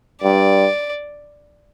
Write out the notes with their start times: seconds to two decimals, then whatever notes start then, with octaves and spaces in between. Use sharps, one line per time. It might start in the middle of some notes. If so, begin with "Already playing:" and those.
0.22 G2 D5